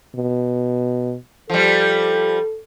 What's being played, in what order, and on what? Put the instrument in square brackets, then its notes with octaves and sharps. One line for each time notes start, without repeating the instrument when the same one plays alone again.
[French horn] B2
[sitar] F3 G3 [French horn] A4